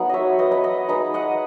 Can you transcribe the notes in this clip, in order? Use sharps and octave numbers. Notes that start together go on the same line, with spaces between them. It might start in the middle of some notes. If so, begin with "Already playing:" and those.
Already playing: F#3 A3 B3 D#4 F#5
C#5 D#5 E5
B4 D#5
B4 D#5
D#5 F#5
G#3 D#4 B4 D#5
D#5 F#5